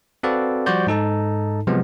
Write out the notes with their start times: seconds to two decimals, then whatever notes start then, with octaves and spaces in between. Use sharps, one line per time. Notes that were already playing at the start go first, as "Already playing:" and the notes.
0.23 C4 F#4 A4 B4 D5 F5
0.66 F3 G3 F#4 C5 D5 G6
0.87 G#2 D#4 A4 A5
1.67 C3 F3 F#3 G#3 B3